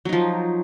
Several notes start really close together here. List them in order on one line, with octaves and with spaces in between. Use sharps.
F#3 D#4 F3